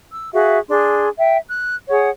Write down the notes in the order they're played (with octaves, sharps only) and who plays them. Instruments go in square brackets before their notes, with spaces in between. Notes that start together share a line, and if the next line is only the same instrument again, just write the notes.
[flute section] E6
F#4 G#4 E5 F5
D4 G#4 C6
E5 G5
F#6
G#4 C#5 F#5